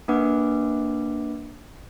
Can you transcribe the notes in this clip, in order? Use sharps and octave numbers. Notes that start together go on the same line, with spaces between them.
A#3 D4 B4 F#5 D6